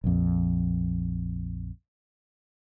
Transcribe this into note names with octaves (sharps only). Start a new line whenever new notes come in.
A#1 F2